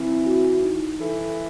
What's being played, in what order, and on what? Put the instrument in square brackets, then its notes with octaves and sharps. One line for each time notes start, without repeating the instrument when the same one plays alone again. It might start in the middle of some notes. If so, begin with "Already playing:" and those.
Already playing: [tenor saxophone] E3 [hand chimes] C4 E4
[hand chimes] F#4
D#4
[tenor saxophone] E3 [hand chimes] A4